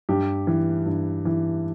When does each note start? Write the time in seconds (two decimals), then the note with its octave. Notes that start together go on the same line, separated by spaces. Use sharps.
0.09 G2 G4
0.47 E3
0.86 G2
1.25 E3